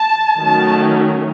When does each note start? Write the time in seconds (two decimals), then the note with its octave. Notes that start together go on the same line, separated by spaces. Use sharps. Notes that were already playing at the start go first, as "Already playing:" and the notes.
Already playing: A5
0.39 D#3 F#3 A3 C#4 A5